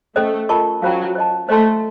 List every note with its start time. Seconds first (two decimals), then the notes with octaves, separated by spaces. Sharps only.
0.15 A3 C#4 A4 C5 D#5
0.49 F4 A#4 D#5 A5 C#6
0.82 F#3 C#4 F4 C5 F5
1.15 C5 D#5 A5
1.49 A3 C5 D#5 A5 C6